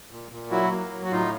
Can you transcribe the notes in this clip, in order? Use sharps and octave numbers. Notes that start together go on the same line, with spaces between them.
A#2
A#2
F#3 E4 F#4
A#3
F#3
F#4
A2 D#4 F4